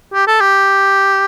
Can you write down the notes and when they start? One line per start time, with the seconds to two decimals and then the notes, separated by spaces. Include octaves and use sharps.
0.14 G4
0.27 A4
0.41 G4